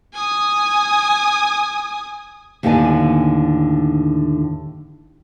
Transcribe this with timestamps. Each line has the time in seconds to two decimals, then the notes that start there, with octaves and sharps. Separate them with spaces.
0.13 G#5 D#6
2.63 D#2 A2 D3 B4 D5 G#5